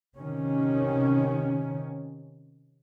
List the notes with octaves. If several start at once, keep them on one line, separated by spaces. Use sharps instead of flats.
C3 D#3 C#4